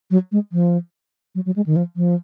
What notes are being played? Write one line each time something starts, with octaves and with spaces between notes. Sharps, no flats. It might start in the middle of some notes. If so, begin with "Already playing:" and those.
F#3
G#3
F3
F#3
F#3
G#3
D#3
F3
F3